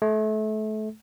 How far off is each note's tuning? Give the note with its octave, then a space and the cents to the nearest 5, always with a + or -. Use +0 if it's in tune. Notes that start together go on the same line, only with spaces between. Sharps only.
A3 -30